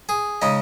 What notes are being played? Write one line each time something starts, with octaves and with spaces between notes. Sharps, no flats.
G#4
C#3 G#3 D#4